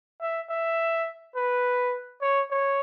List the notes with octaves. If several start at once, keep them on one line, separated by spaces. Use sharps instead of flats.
E5
E5
B4
C#5
C#5